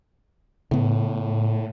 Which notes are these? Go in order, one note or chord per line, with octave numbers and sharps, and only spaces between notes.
A2 C#3 B3